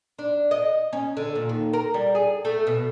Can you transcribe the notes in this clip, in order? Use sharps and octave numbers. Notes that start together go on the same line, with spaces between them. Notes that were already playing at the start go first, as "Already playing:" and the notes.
D4
D#5
C#4
D3
A#2
D#2
A#4
G3
G#4
A3
B2